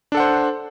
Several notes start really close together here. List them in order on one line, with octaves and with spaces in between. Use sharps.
D4 A4 F#5 C5